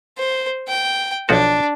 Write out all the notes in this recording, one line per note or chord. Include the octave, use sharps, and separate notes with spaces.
C5
G5
B1 F3 D4 F#4